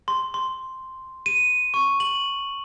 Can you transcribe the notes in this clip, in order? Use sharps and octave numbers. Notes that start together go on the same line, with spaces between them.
C6
C6
D#7
C#6
F#7